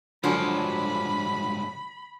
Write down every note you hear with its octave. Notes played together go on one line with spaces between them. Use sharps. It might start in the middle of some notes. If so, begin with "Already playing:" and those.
C#2 G2 D3 F3 F#3 C#4 D4 B5